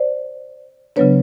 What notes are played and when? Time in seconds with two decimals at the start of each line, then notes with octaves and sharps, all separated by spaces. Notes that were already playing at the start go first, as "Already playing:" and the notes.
Already playing: C5 D5
0.96 C#3 F#3 B3 D4 B4 C#5